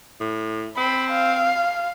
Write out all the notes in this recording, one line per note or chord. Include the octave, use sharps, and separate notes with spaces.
A2
C4 B5
F5